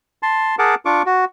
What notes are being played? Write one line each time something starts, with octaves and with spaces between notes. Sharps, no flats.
A5 C6
G#4 A#4 F#5 A5 D6
D4 F4 C#6 D6
F#4